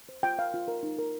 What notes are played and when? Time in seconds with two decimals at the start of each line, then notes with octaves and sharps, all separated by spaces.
0.09 C5
0.23 F4 G5
0.39 A#4 F5
0.54 F4
0.68 A#4
0.83 D#4
0.98 A#4